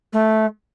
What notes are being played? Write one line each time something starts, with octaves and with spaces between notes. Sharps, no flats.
A3